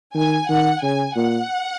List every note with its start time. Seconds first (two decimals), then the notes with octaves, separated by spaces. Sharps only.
0.15 D#3 G#5
0.48 D#3 F#5
0.82 C#3 G#5
1.16 A#2 F#5